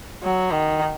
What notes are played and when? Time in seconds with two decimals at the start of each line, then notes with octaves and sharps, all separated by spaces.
0.23 F#3
0.51 D#3